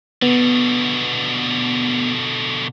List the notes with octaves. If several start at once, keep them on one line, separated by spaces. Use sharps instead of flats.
B2 D3 B3